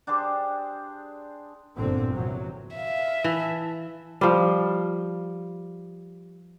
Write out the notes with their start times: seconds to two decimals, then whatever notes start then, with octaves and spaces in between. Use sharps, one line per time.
0.07 D4 G4 G#4 C5
1.77 G1 A#2 D3 C4
2.14 E2 C3 F#3
2.76 E5 F5
3.24 E3 A5
4.21 F3 G3